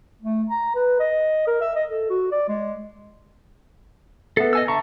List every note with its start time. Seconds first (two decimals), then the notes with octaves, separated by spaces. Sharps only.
0.22 A3
0.49 A#5
0.75 B4
1.00 D#5
1.47 A#4
1.61 E5
1.76 D#5
1.89 A4
2.10 F#4
2.31 D5
2.48 G#3
4.37 B3 A4 E5 C7
4.53 D#5 G#5 E6
4.68 D3 E5 A5 A#5 C#6